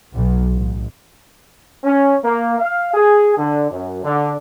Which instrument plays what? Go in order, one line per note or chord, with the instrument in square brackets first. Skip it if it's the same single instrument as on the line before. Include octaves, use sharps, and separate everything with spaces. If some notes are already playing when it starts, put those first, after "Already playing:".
[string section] B1
A1
[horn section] C#4
A#3
F5
G#4
D3
F#2
D3